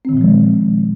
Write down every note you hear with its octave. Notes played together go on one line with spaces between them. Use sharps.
A#2 D#3 F3 G#3 C4